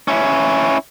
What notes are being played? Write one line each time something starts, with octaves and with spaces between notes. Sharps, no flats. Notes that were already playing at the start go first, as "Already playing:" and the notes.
C#4 E4